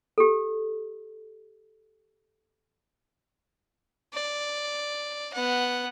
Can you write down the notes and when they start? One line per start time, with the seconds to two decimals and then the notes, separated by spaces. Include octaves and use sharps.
0.18 G4 A4
4.14 D5
5.33 B3 F#5